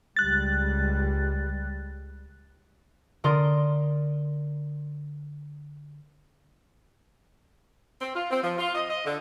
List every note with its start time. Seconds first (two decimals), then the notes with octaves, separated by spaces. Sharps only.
0.16 C#2 G3 F#6 A6
3.24 D3 A#4 D5 C6 D#6
8.01 C4
8.15 F4
8.31 C4
8.43 F3
8.58 F4
8.75 D#5
8.89 D#5
9.06 D3